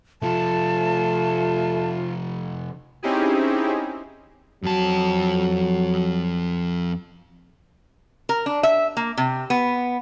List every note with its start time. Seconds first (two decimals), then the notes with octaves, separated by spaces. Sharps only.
0.22 C3 F3 A3 F4 A5
3.03 C4 C#4 D#4 E4 G4 G#4
4.63 F2 F#3 A5
8.29 A#4
8.46 D4
8.63 E5
8.97 A#3
9.17 C3
9.50 B3